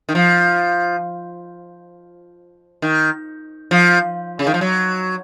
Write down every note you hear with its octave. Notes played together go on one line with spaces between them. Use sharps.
D#3
F3
D#3
F3
C#3
D#3
F3
F#3